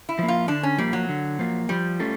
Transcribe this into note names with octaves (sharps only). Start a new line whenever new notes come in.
E4
F3 A#3
F4
D3 D4
C#4
F3 G3 A#3
F#3
D3
F3 A#3
F3 G3
A3 C#4 F4 A4